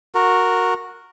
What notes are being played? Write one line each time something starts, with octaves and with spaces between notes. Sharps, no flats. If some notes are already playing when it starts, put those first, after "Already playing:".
F#4 A#4